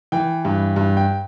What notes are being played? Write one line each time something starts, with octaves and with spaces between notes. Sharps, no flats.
E3 G5
G2
G2
G5